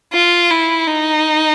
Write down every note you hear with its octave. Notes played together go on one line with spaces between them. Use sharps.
F4
E4
D#4